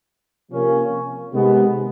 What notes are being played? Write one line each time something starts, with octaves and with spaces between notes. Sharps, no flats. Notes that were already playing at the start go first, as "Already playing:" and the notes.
C3 F3 A#3 C#4
C3 D#3 G#3 B3